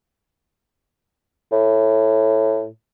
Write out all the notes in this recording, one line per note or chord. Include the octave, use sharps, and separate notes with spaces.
A2